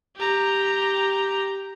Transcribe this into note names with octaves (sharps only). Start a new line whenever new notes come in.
G4 A#5